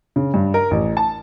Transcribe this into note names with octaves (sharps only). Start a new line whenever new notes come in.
C#3
G2
A#4
A1
A5